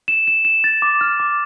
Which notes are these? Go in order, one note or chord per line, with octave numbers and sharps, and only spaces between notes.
E7
E7
E7
A6
D6
F6
D6